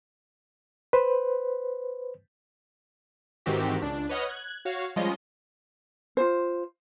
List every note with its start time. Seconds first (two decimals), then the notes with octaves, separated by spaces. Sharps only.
0.93 B4 C5
3.46 G#2 D#3 E3 C4 F#4 G4
3.82 C#2 D4
4.09 B4 C#5 D#5 F#5 D#6 F6
4.29 F#6 G#6
4.65 F#4 C#5 F5
4.96 F3 G3 G#3 C#4 F4 D#5
6.17 F4 C5